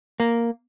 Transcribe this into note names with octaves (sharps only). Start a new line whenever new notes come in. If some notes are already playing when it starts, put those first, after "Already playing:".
A#3